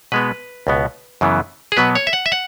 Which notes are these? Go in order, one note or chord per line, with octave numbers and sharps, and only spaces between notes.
B2 G#3 B3 B4
C#2 B2 B3
F#2 C#3 E3 B3
G#4
B2 F#3 B3 B4
C#5
E5
F#5
E5
F#5